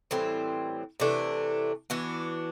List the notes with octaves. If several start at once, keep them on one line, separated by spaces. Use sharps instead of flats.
A2 E3 G3 C4
C3 E3 A3 D4
E3 B3 D4 F#4